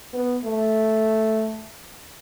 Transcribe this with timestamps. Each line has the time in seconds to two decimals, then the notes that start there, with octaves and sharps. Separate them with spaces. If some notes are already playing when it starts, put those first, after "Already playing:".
0.14 B3
0.45 A3